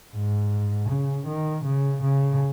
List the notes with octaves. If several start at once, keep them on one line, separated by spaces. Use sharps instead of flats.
G#2
C#3
D#3
C#3
C#3